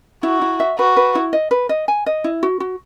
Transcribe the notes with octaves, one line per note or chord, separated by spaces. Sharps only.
E4 F#4
E4
E5
F#4 B4
B4
E4
D#5
B4
D#5
G#5
D#5
E4
F#4
F#4